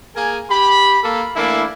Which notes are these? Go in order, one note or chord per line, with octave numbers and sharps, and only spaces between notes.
A#3 G#4 A#4 G#5
G4 B5
A#3 A4
E3 A3 A#3 D4 E4